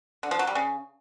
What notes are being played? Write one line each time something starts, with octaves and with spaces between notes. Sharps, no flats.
D3
F3
F#3
G3
C#3